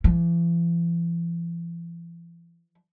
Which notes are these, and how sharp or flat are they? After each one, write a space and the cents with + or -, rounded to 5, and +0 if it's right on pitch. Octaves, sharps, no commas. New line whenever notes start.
E3 +45